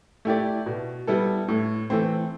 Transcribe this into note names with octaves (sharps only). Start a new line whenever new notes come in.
A3 E4 G4 D5
B2
G3 B3 E4 A4
A2
E3 A3 C4